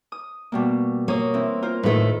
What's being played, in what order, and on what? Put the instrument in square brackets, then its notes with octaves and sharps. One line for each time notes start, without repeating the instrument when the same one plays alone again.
[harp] D#6
B2 G3 A#3
[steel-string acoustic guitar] A#3 [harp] C#5 D#6
[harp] E3 C4
F4 A#4 C5
[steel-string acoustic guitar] A2 A3 [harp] D#3 D#4 B4